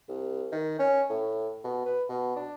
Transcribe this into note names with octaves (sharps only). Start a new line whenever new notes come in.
C2
D#3
C#4
A2
B2
B4
B2
D4